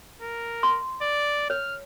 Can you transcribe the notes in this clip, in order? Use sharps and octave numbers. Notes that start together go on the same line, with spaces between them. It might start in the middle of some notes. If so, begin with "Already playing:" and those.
A#4
C6
D5
C#5 F6